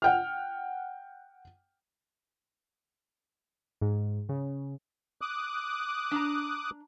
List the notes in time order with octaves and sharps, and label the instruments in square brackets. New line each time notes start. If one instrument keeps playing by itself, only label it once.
[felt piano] F#5 G5 F6
[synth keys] G#2
C#3
[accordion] D6 D#6 F#6
[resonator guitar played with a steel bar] D4 A#5